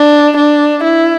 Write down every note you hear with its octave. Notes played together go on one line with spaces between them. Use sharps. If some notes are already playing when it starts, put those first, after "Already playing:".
Already playing: D4
D4
E4